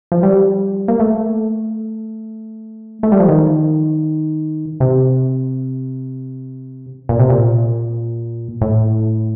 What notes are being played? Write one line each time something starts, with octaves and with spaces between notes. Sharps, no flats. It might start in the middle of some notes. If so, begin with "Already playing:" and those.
F3
G3
A#3
A3
A3
G3
F3
D#3
C3
A#2
C3
A#2
A2